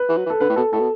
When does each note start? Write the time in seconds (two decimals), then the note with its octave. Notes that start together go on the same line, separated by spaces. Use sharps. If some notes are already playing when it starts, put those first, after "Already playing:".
Already playing: B4
0.09 E3
0.17 F#3
0.26 E3
0.30 A4
0.40 D3 B4
0.50 A2
0.56 B2 A4
0.72 A2 A4
0.80 B2